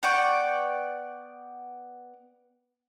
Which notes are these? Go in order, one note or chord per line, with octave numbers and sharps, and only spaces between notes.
B3 D5 G5 C#6